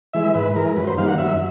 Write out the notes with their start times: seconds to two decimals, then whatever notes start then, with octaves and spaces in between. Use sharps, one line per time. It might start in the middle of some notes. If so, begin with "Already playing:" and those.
0.13 E3 G#3 E5
0.34 G#2 B4
0.56 E3 G#3 A#4
0.76 F#2 B4
0.87 C5
0.98 D#3 G3 A#3 F5
1.08 F#5
1.18 F#2 E5